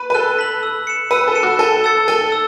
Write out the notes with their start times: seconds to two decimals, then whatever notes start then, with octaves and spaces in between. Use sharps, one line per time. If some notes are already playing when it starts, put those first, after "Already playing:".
Already playing: B4
0.10 B4
0.15 A4 F#6
0.39 B6 F#7
0.63 E6
0.87 C#7 E7
1.11 B4 E6
1.28 A4
1.35 C#7 E7
1.43 F#4
1.59 A4 A5
1.84 E6 A6 C#7
2.08 A4 A5
2.32 E6